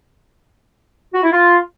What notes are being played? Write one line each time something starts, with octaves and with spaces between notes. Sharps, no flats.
F#4
E4
F4